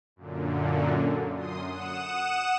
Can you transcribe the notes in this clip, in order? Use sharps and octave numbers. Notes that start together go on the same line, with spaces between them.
F#2 A#2 D3
F#2 C6 D#6
F#5 D#6 E7